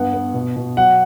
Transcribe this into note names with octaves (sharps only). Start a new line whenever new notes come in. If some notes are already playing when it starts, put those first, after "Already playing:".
Already playing: G2 B3 F#5
B3
B2
B2
F#3 F#5